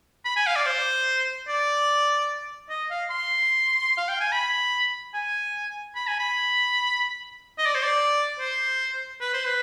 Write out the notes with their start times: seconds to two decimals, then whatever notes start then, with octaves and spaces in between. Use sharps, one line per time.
0.25 B5
0.36 G#5
0.47 F5
0.56 D5
0.66 C5
1.48 D5
2.70 D#5
2.91 F5
3.10 C6
3.97 F5
4.09 G5
4.20 G#5
4.32 B5
5.14 G#5
5.96 B5
6.08 G#5
6.20 B5
7.58 D#5
7.66 D5
7.75 C5
7.83 D5
8.39 C5
9.21 B4
9.33 C5
9.46 B4